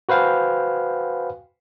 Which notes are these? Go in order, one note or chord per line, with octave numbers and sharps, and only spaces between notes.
F#4 B4 C5 F5 G5 G#5